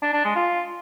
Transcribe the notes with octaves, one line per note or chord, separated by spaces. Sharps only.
D4
D4
G#3
F4